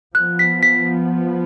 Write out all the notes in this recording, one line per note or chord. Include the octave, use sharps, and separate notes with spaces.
F3 B3 F#6
B6
B6